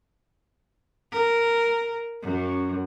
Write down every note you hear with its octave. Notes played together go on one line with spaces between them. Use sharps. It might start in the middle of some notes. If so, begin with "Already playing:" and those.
A#4
F#2